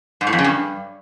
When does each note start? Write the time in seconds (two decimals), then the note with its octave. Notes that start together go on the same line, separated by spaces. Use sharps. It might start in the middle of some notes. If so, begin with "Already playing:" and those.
0.21 G#2
0.27 A2
0.33 F2
0.39 C#3
0.44 G2